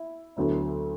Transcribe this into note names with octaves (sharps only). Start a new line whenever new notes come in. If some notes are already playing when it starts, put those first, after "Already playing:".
Already playing: E4
D2 D3 F#3 B3 E4